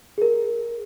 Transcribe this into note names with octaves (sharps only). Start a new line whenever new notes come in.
G#4 A#4